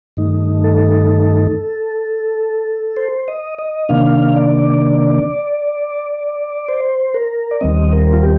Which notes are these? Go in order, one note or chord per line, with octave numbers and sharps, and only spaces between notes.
G2 D#3 A3 D#4
A4
C5
D#5
D#5
C3 D#3 A#3 D4 F5
D5
C5
A#4
D5
D#2 D#3 G3 C4 D#5
A#4
F4
G4